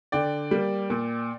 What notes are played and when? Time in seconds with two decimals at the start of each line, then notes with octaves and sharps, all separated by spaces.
0.12 D3 D5 G5
0.51 G3 A#3
0.90 A#2